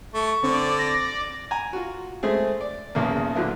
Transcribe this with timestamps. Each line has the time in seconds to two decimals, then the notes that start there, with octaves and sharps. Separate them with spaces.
0.14 A3 C#6
0.43 D3 C4 D5
0.79 A#6
1.51 G#5 A#5
1.73 F4 F#4
2.23 G#3 A3 C4 G#4
2.61 D5
2.95 B1 E2 C#3 A#3
3.35 A#2 D3 F#3 B3 E4 F4